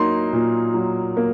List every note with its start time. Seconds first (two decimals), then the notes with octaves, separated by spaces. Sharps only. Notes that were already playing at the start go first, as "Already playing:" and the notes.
Already playing: F#3 A#3 D#4 C6
0.33 A#2
0.74 F#3
1.17 A#3